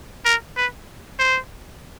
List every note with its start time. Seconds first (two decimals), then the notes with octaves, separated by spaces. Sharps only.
0.25 A#4
0.57 B4
1.19 C5